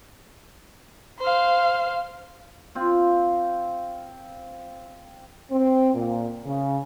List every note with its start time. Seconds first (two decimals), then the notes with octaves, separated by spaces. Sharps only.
1.20 C5 F5
2.75 C4 F4
5.51 C4
5.94 A#2
6.45 C#3